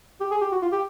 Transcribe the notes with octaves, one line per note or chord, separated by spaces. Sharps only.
G4
G#4
G4
F#4
F4
G4